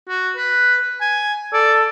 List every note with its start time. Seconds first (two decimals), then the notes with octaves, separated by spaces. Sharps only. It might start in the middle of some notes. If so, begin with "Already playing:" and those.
0.09 F#4
0.36 B4
1.01 G#5
1.53 A4 D5